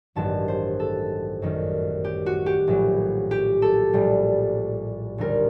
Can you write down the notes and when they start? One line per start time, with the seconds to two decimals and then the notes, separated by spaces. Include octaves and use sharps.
0.15 A1 G2 D#3 F#3 A5
0.48 C5
0.80 A4
1.42 F#2 D#3 G3
2.04 G4
2.26 F#4
2.46 G4
2.67 A#1 A2 F#3
3.31 G4
3.62 A4
3.93 A#1 A2 G3
5.18 D#2 D3 G3 A#4